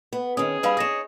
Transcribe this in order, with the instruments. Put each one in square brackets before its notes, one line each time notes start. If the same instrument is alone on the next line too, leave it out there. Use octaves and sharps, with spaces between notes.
[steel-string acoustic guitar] B3
[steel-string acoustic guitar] D#3 C#4 [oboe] G#4 [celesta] D#6
[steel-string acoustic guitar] G3 D4 [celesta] B4 F5 B5
[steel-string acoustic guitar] D#4 C#5 [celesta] D#6 A#6 E7